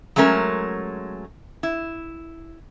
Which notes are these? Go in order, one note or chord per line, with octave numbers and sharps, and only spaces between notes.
F#3 G#3 A3 C#4 A#4
E4